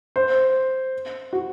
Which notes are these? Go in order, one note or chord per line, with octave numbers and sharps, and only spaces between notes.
C5
F#4